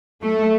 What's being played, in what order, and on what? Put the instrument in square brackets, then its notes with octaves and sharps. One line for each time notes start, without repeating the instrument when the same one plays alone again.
[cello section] A3